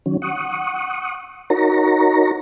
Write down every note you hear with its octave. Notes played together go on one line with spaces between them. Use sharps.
D#3 F#3 C#4
F#5 C#6 D#6
D#4 F#4 A#4 C#5 A#5